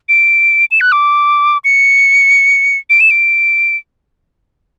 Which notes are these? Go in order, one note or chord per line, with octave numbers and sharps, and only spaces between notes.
D7
E7
F#6
D6
C#7
D7
E7
D7